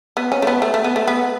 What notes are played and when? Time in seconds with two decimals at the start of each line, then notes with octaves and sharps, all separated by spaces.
0.17 B3
0.32 C#4
0.42 A3
0.47 B3
0.62 A3
0.74 A3
0.84 B3
0.96 A3
1.07 B3